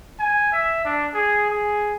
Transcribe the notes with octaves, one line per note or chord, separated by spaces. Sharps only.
G#5
E5
D4
G#4
G#4